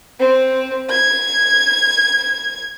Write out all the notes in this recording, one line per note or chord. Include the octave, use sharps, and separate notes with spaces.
C4
G#6